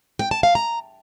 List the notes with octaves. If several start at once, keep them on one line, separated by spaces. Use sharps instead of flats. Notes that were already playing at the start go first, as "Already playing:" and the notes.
G5
A5
F5
A#5